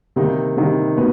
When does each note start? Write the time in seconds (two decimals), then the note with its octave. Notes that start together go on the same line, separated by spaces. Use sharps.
0.16 C3 D#3 G3 A#3 D#4
0.57 C3 D#3 G3 A#3 D#4
0.97 B2 B3